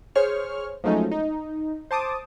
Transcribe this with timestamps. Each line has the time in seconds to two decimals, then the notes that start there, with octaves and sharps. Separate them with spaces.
0.15 G#4 C5 C#5 C#6 F6
0.84 F3 F#3 G#3 A3 C#4 D#4
1.11 D#4
1.91 C5 A5 D6 D#6